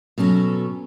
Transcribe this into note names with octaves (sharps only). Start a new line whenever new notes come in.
B2 F#3 C#4 A4